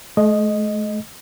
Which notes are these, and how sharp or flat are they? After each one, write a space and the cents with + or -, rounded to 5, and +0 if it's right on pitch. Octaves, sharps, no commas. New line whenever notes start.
A3 -45 D#5 +0